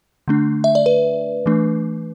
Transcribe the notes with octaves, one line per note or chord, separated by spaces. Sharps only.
D3 A3 D4
E5
D5
B4
E3 A3 D4